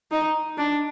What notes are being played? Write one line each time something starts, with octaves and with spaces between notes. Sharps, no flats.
D#4
D4